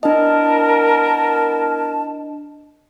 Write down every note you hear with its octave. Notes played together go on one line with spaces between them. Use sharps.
B3 D4 E4 A#4 D#5 A5